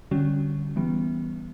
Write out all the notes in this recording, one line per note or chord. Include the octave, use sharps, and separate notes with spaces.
D3 G3 C#4 F#4
E3 G3 B3